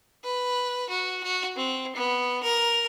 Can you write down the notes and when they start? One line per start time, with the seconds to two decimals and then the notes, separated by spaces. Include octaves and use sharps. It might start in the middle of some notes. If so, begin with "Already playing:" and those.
0.24 B4
0.89 F#4
1.24 F#4
1.56 C4
1.95 B3
2.43 A#4